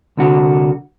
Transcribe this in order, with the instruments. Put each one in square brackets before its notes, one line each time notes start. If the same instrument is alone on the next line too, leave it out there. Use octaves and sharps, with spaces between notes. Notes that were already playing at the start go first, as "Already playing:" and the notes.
[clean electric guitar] C2 D3 F#4